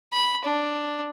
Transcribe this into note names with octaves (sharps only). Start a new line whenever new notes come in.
B5
D4